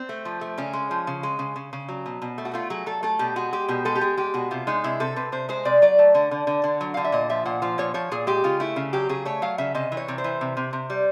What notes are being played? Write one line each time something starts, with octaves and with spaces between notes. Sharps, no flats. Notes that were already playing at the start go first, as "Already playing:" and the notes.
Already playing: C4
A3
F3
A3
C#3 C#4
G#3
F3
C#3
G#3
C#3
C#3
C#3
F#3
B2
B2
A3
F#4
A3 F4
F#3 G#4
F#3 A4
A3 A4
B2 G4
G#3 F#4
G#3 G4
B2 G4
G#3 A4
G4
G#3 G#4
G#3 G4
B2 F#4
C3 F4
G#3 D#4
C3 E4
C3 A4
C3 B4
C3 C5
G#3 C5
C3 D5
F#3 D5
A3
D3
D3
D3
D3
F#3
D3 F5
E5
A#2 D#5
F3 E5
A#2 F#5
F3 F5
A#2 C#5
F3 C#5
A#2 G#4
G#3 G4
C#3 F4
A3 E4
C#3
F#3 G4
C#3 G#4
A3 C#5
F#3 F5
C#3 E5
C3 D#5
E3
C#5
C3
C5
E3
C3
C3
C3
G3